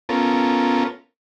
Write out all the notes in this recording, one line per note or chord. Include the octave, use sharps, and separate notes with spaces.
B3 C#4 F4 A4 A#4